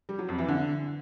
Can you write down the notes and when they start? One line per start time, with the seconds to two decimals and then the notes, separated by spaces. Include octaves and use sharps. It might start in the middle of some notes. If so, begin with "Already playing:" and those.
0.09 G3
0.19 F#3
0.29 F2
0.38 E3
0.48 D3